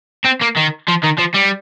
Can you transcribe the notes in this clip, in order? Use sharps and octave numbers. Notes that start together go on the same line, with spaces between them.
C4
A#3
D#3
F3
D#3
F3
G3